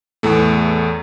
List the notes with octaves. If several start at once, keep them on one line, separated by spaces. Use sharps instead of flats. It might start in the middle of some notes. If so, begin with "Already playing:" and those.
E2 A2 A3